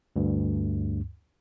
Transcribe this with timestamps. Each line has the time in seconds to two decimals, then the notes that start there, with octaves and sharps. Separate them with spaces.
0.16 D2 G2